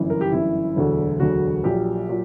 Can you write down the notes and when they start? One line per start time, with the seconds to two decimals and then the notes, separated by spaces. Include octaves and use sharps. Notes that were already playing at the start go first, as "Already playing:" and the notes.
Already playing: G1 F#2 E3
0.10 A#4
0.21 G4
0.32 G1 F#2 E3 E4
0.76 E1 D2 D3 F#3
1.20 E1 D2 D3 F#3 F#4
1.64 A#1 A#2 F#3 G4
2.09 A#2 F#3